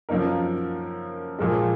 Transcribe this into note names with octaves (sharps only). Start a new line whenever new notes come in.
F#2 F3 A#3 D#4 A#4
A#2 F3 G#3